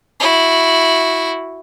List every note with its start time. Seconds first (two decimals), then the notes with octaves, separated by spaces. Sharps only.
0.20 E4 F#4